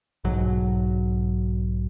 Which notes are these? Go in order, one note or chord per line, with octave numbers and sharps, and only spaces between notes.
B1 G#2 F#3